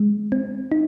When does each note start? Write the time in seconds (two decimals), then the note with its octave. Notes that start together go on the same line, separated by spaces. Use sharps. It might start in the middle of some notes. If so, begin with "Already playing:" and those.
Already playing: G#3
0.32 C4
0.72 D#4